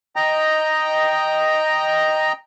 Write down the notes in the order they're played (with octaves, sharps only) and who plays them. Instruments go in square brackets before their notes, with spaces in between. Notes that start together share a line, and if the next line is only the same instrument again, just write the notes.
[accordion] D#5 G5 A#5